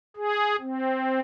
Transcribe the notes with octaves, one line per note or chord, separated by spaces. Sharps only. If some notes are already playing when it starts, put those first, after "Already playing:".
G#4
C4